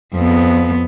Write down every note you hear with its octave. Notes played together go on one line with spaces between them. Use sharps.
F2 B3